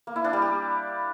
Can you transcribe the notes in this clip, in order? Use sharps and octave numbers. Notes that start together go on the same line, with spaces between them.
A#3
E4
D4
G3
G4